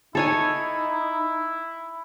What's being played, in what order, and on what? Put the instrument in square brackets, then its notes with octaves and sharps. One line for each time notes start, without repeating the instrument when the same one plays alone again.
[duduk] D#4 [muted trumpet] E4 [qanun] A4 C#5 G#5